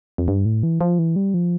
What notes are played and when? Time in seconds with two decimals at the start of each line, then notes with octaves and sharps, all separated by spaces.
0.18 F2
0.28 G2
0.46 A2
0.63 E3
0.81 F3
0.99 E3
1.16 G3
1.34 F3